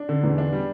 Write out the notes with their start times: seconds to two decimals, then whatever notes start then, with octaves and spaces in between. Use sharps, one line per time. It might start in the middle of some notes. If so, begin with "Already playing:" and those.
Already playing: D4
0.09 D3
0.23 E2
0.38 D4
0.53 G3